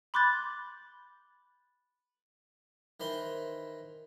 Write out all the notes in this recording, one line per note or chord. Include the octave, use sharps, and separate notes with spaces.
B5 C6 D6 F#6 G6 A6
D#3 E3 C5 B5 C6